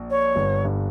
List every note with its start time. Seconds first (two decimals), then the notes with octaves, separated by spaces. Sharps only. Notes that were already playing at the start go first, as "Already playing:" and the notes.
Already playing: A#1
0.10 C#5
0.35 G1 G2
0.65 G2